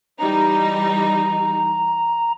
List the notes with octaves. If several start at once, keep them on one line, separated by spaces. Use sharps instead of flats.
E3 G3 D#4 A#5